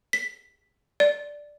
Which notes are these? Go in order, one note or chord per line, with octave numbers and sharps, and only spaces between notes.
B6
D5